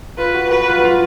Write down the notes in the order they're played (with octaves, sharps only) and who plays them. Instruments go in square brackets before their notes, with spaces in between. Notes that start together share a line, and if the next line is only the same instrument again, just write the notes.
[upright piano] F4 [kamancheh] B4
[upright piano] F#4
[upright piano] F#4 [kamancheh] B4
[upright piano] F4
F#4
F4